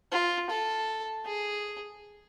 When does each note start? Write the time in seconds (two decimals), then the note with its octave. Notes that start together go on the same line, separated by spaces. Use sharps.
0.12 F4
0.50 A4
1.25 G#4